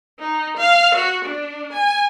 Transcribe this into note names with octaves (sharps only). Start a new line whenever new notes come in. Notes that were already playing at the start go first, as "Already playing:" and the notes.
D#4
F5
F#4
D4
G#5